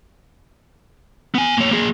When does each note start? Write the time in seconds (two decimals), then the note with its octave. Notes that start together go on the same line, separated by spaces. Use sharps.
1.35 B3 G#5
1.57 A#3 C#5
1.71 A#3 G#4